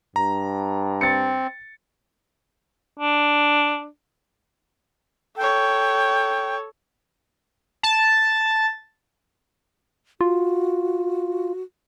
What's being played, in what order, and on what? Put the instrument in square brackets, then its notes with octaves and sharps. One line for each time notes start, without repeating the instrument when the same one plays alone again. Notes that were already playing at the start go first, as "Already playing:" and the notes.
[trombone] G2 [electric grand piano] A#5
[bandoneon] C4 [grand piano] A6 C#7
[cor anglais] D4
[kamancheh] A4 C#5 [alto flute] G5
[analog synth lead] A5
[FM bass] F4 [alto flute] F#4